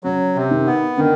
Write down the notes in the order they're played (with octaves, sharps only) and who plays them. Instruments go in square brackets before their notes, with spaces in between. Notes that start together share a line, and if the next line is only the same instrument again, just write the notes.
[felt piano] C#3 [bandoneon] F#3
[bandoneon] C3
[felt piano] D#3
[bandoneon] B3
[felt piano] D3 [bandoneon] D#3